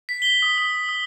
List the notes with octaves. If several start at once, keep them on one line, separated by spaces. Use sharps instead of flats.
B6
G7
D#6
D#6
D#6